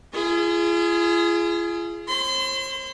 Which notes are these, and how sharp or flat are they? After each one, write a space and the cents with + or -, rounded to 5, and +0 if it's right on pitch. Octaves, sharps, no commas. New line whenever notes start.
F4 -40 G#4 +10
C5 +40 C6 -35